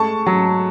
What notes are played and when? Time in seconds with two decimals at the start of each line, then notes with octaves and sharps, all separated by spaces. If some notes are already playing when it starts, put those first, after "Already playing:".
Already playing: G#3 A3 A5 C#6
0.26 F#3